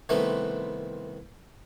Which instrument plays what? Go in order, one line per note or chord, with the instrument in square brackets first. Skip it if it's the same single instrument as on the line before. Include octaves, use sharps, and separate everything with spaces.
[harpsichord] C2 D#3 A3 B3 C4 B4